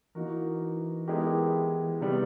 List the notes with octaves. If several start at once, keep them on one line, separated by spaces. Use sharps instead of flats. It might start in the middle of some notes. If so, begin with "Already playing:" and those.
E3 A#3 D#4 F#4 A#4
G#3 B3 E4 G4 A#4
C3 D#3 G3 B3